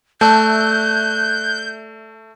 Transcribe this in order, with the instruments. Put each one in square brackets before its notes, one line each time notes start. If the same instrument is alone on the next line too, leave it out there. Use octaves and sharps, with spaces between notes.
[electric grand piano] A3 [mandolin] D5 E5 A5 [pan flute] F#6 [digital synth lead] G6